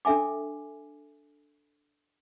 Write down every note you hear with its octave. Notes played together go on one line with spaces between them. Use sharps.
D4 A4 E5 G#5 D6